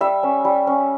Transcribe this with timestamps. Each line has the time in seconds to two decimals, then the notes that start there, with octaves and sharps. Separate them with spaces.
0.01 G3 E5
0.23 C#4
0.45 G3
0.67 C#4